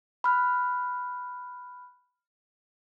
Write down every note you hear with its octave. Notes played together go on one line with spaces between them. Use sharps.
B5 F6 F#6